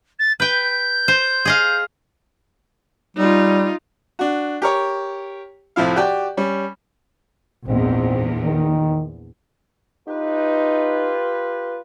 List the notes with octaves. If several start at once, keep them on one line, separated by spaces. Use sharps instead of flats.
A6
B4 G5 G6
C5
G#4 D#5 F5
G3 D#4 F4
D4 F#4
G4 A#4 C#5
C2 A2 F3 E4 F5
F#4 G4 D5 G5
G3 C#4
A#1 E2 G#2 C4
D#3
D#4 F4 G4 B4